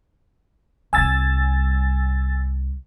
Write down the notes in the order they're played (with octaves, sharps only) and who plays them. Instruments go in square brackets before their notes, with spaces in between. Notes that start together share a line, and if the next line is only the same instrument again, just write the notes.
[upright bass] C2 G3 [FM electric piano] G#5 E6 A6